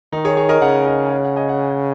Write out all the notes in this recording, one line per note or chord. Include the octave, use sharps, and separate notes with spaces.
D#3 D#4
G#4 C#5
G#4 C#5
A#4 D#5
C#3 C#5 F#5
A#4 D#5
G#5
C#5 F#5
C#5 F#5
D#5 G#5
C#5 F#5